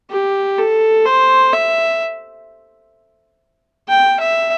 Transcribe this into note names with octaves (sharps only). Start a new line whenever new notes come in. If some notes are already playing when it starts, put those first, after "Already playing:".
G4
A4
C5
E5
G5
E5